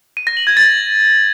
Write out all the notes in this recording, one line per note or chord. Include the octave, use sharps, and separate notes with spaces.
D#7
A#6
F#7
G#6
A6